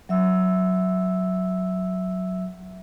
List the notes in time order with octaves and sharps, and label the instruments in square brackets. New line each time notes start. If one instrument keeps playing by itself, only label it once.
[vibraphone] F#3 E5 E6